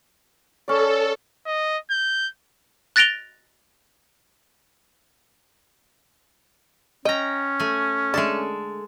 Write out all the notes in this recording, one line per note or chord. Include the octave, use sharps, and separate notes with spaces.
C#4 A4 D5
D#5
G6
F#6 A6 A#6 D7 F7 G7
C#4 D#5 G5 A#5
A3 G#5
D3 G#3 A3 A4 A5